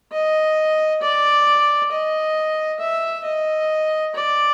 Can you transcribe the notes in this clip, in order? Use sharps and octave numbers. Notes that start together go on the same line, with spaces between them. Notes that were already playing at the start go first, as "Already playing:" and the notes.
D#5
D5
D#5
E5
D#5
D5